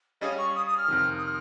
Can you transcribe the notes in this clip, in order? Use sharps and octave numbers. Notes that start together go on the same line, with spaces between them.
G3 C#4 G#4 C#5 D#5 F5
C#6
D#6
D#6
F6
F2 C3 D#3
D#6
F6